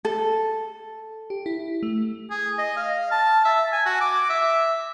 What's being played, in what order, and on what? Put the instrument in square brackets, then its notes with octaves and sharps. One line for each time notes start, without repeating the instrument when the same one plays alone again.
[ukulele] A4
[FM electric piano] G4
E4
A3
[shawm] G#4
D#5
F5
A5
E5
G#5
F#4
D6
E5